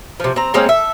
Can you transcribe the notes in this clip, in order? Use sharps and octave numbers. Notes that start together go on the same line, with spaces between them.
C3 F3
C4 A#5
G#3 A#3 C4 C#4
A4 E5